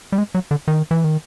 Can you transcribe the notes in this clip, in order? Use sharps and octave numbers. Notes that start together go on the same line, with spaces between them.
G3
G#3
F#3
D3
D#3
E3
D#3